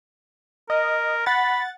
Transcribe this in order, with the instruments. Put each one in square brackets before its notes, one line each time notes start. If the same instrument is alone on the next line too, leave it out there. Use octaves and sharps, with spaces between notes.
[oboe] A#4 [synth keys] D#5
[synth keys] F#5 A6 [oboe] B5